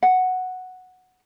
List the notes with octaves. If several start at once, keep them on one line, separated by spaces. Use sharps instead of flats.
F#5